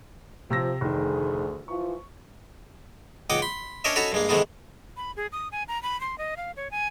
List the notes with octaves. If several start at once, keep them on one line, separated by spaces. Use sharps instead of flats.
C3 F3 E6 A#6
F1 D2 D#3 G#4
E3 F3 C#6
C#2 D#4 F#5 G5 D6 D#6
B5 C6
C#4 D4 A#4 C#5 D#5 E5
C#4 D#4 F#4 A4 C#5 B5
G2 G#3 A#3
C3 D#3 G#3 A3 B3 D#4
B5
G#4
D#6
G#5
A#5
B5
C6
D#5
F5
C#5
G#5